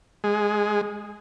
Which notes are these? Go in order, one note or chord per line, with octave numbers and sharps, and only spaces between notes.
G#3